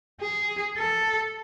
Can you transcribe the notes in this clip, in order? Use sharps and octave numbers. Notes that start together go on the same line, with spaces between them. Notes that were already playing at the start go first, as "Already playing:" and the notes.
G#4
A4